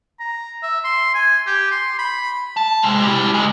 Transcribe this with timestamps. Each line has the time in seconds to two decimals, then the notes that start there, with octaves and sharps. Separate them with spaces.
0.20 A#5
0.63 E5
0.84 C6
1.15 G#5
1.47 G4
1.71 C6
1.99 B5
2.57 A5
2.82 C3 G#3
3.03 E4 G4
3.34 C#2 G#3